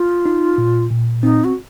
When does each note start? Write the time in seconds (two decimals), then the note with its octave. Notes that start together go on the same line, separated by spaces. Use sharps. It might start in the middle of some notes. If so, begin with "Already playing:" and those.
Already playing: F4
0.26 D#4
0.58 A#2
0.91 A#2
1.23 C4 D#4
1.44 F#4